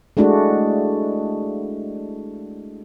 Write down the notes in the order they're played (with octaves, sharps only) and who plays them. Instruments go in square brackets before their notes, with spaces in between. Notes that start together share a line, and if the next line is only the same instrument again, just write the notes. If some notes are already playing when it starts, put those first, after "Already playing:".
[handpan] G#3 A3 D4 E4 F#4